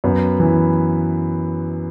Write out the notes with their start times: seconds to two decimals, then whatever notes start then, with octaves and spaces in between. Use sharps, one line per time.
0.04 F#2 B3
0.40 E3